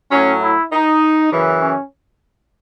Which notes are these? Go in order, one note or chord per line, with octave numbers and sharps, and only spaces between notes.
A2 F#3 C#4
E4
D#4
F#2 C#3 E3
C#4